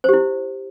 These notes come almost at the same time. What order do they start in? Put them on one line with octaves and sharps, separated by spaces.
C5 G4 E4